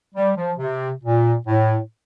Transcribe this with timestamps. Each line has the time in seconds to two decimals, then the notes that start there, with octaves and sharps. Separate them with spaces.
0.14 G3
0.36 F3
0.58 C3
1.03 A#2
1.46 A2